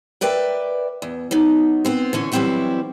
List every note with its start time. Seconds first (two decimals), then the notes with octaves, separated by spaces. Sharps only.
0.21 A#4 B4 D5 E5 G5
1.02 E2
1.31 F#3 B3 D#4
1.85 B3 C4 C5
2.13 D3 E3 C#4
2.32 E3 F#3 G3 C4 E4 F#4